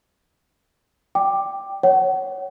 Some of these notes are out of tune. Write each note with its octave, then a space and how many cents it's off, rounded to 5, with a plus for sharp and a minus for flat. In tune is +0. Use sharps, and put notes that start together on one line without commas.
D5 +0 G5 +0 D6 +10
C#5 +0 F#5 +30